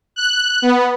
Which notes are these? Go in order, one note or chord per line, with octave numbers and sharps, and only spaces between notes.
F#6
B3